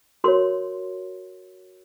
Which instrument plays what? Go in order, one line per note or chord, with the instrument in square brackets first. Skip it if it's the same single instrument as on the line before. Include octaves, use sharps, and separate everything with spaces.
[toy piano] F#4 A#4 C#5 C6